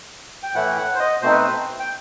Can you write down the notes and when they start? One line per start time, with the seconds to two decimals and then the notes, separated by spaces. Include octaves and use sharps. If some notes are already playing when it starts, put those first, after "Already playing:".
0.43 G5
0.54 A2 E3 A3 E4 F#5
0.77 F#5
0.95 C5
1.00 D#5
1.22 B2 A3 C4 D#4 C5
1.31 B4
1.42 C5
1.80 G5